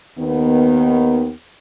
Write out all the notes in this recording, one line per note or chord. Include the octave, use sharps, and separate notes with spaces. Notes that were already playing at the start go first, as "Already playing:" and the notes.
D#2 D#3 B3